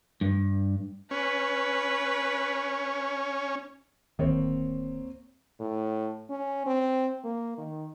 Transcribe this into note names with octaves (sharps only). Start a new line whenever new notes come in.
G2
C#4 B4
D1 D#3 A#3 C4 C#5
A2
C#4
C4
A#3
D#3